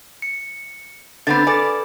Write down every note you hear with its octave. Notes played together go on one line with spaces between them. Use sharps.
C#7
D3 B3 C4 B5 A6
A4 B4 D5 G#5